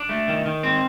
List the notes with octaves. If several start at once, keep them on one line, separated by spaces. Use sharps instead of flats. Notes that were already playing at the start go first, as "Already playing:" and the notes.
Already playing: D4
A3
D#3
D#3
C4